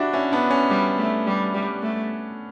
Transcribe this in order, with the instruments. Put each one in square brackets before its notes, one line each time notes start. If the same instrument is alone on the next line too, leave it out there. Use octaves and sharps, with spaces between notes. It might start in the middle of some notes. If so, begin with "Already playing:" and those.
Already playing: [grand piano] D4 E4 F#4 G4
C#4 E4
B3 D4
C#4
[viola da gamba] G3
A3
G3
G3
A3